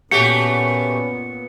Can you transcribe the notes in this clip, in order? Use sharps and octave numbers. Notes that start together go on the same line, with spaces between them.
A#2 A3 B3 C#4 F#4 G4 C#7